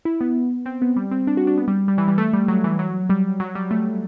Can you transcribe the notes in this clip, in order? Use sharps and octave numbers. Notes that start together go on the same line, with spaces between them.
E4
B3
C4
B3
G3
C4
D4
F#4
D4
B3
G3
G3
E3
G3
A3
G3
F#3
E3
F#3
G3
F#3
G3
A3